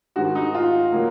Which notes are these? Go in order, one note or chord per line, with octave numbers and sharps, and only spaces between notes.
G#2 D#3 G#3 F#4
D#4
F4
F#3 A#3